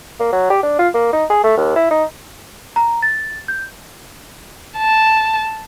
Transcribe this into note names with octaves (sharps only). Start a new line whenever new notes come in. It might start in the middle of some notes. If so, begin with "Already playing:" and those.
A#3
F#3
G4
D4
F4
A#3
D#4
G#4
A3
D#2
E4
D#4
A#5
A6
G6
A5